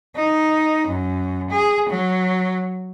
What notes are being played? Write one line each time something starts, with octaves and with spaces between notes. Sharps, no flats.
D#4
F#2
G#4
F#3